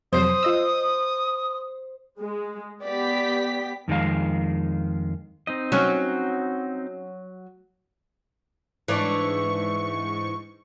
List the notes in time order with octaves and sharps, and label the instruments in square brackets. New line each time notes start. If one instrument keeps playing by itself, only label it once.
[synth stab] F2 C3 F#3 [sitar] C5 [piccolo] D#6
[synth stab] F4 D#5 E6
[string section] G#3
[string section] B3 G4 B6 [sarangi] D5
[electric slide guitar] F2 D#3 G#3 F5
[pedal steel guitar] C4 D#4 D#5
[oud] F#3 [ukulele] C#4
[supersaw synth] G#2 C#6 [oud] E3 D4